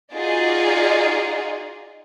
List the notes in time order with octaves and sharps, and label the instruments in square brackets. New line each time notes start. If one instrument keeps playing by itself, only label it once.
[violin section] D#4 F4 F#4 G#4 D5 D#5